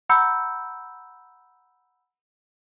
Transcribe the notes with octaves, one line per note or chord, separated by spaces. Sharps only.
F#5 A#5 B5 E6 G6 C#7